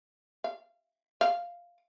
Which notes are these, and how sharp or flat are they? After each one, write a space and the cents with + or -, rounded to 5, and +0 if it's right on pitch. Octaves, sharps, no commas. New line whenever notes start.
F5 -25
F5 +0